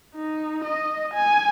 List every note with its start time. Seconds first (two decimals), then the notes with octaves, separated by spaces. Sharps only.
0.15 D#4
0.65 D#5
1.14 G#5